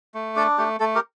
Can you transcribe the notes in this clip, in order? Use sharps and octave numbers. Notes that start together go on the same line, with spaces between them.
A3
D4 A4
A3 G4
A3 A4
G4 A#4